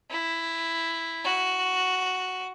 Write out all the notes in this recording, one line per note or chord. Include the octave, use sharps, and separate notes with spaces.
E4
F#4